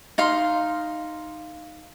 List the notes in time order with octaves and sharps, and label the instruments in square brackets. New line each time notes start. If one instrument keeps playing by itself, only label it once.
[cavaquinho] D#4 F5 C6